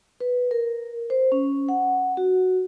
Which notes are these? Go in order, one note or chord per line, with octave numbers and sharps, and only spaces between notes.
B4
A#4
C5
C#4
F#5
F#4